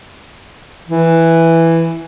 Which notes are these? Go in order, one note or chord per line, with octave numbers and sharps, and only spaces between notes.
E3